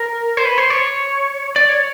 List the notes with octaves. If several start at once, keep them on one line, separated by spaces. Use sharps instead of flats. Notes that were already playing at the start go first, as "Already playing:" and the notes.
Already playing: A#4
C5
B4
C5
C#5
D5
C#5